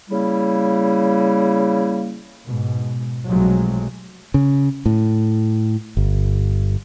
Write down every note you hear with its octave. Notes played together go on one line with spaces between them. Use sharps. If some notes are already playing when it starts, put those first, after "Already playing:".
C#3 G3 A#3 E4
G#2 B2
B1 C3 F3 F#3 G#3 A3
C#3
A2
G1